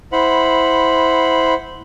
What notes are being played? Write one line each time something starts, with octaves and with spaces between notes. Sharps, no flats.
E4 C5 F#5 B5